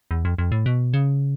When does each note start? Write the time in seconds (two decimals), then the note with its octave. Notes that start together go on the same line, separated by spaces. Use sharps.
0.11 E2
0.25 F2
0.38 F2
0.52 A2
0.66 B2
0.93 C#3